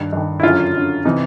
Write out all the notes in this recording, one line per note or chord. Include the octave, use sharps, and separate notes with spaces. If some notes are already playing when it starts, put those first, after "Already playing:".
Already playing: G2 D#3
G2 D#3
E4
F#2 D3 F4
F#2 D3
C3 E3 D#4